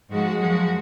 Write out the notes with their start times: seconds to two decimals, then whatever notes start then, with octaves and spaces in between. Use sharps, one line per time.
0.10 G#2 F3 G#3 F#4
0.38 F#2 F3 G#3 F#4